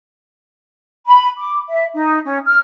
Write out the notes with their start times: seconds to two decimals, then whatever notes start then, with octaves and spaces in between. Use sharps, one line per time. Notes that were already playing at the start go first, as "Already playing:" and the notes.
1.07 B5
1.37 D6
1.69 E5
1.94 D#4
2.24 C#4
2.46 F6